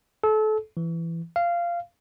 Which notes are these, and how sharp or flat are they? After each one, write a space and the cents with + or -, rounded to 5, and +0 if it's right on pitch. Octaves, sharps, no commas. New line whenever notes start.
A4 -30
E3 +15
F5 -15